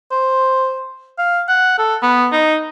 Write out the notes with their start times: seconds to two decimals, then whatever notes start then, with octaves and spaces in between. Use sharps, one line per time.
0.12 C5
1.18 F5
1.49 F#5
1.78 A4
2.02 B3
2.32 D#4